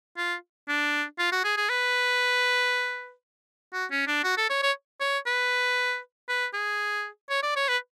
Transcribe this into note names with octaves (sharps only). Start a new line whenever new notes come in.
F4
D4
F4
F#4
G#4
G#4
B4
F#4
C#4
D4
F#4
A4
C#5
C#5
C#5
B4
B4
G#4
C#5
D5
C#5
B4